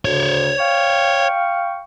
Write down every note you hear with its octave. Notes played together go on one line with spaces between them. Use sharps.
D2 C#3 C#5 D5
F5 G5 C#6